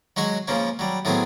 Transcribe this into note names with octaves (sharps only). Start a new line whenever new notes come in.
F#3 G#3 F#4 C#5
C#3 F3 A#3 C#4
F#3 G3
A2 F#3 B3 C4 G#4